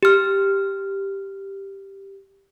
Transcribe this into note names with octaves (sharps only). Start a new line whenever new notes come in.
G4 F6